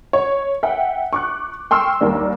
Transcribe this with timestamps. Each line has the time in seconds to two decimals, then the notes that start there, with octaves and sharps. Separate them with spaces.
0.13 C#5
0.63 E5 F#5 G5
1.13 C#6 D6 F#6
1.71 G5 C6 C#6 E6 F6
2.01 D#2 G3 A#3 D4